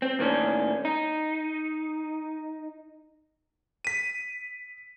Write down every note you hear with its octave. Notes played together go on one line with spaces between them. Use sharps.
C4
A2 D#3 A#3 C#4 D4
D#4
B6 D#7